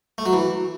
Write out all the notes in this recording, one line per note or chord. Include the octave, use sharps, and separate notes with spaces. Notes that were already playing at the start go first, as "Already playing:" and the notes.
A3
F#3
E3